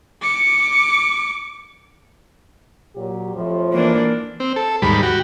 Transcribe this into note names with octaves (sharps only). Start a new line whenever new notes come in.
D6 C#7
A#2 F#3 G4
F2 A2 F3
E3 A#3 D4
C4
A4
D#2 G#2 G3 B5
F#4 G4